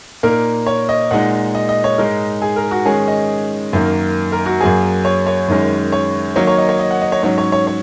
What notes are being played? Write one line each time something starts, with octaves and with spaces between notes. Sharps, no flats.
A#2 A#3 D#4 A#4
C#5
D#5
A#2 G#3 D#4 F#5
D#5
D#5
C#5
G#2 G#3 D#4 A#4
G#4
A#4
F#4
G#2 D#3 G#3 C#4 G#4
D#5
F#2 D#3 A#3
A#4
F#4
F#2 F#3 A#3 G#4
C#5
C#5
F#2 D#3 G#3 C#4
C#5
D#3 F#3 A#3 D#4 C#5
C#5
D#5
C#5
D#5
F#5
D#5
C#5
G#2 F#3 C#4 C#5
C#5
C#5
C#5